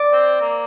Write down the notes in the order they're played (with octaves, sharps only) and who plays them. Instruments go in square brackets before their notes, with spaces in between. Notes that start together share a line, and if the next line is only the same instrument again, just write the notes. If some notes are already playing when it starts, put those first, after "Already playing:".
Already playing: [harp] D5
[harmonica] C4
A#3